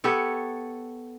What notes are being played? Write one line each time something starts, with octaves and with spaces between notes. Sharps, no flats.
B3 G4 A4 C#5